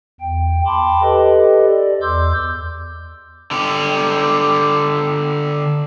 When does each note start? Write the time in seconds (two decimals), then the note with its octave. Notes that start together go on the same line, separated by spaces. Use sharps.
0.21 E2 G5
0.66 G5 A5 B5 C6 D6
1.02 G4 A4 B4 D#5
1.67 D5
2.02 E2 C6 D6 E6 G6
3.51 D3 G4